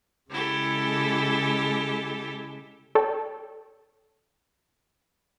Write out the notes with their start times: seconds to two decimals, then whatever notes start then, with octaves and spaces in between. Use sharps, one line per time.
0.31 C#3 G#3 E4 G4 A4
2.95 A4 C#5 D5 G5 A5